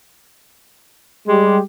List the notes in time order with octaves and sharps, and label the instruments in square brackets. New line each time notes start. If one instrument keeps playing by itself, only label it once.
[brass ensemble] G3 G4 [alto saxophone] G#3